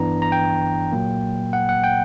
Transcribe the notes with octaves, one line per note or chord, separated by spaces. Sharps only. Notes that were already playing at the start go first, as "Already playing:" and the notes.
Already playing: G2 E3 B3 D4 A#5
A#5
G5
A#2 F#3 A#3
F#5
F#5
G5